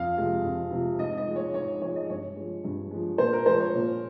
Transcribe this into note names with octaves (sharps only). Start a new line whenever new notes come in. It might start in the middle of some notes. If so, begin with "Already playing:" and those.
Already playing: F2 F5
C3 F3 G#3
F2
C3 F3 G#3
G#2 D#5
D#5
F3 G#3
C#5
G#2 C#5
F3 G#3 C#5
D#5
G2 C#5
F3 G#3
G2
F3 G#3
A#2 C5
A#4
F3 G#3 C5
C#5
A#2